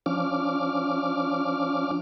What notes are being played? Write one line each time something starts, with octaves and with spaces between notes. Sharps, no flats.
F3 C#4 D4 D6 F6